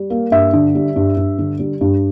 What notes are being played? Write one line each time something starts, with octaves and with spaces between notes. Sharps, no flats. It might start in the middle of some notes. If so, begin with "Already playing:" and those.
Already playing: G3
A#3
G2 E5
D3
G3
G2
G2
D3
G3
G2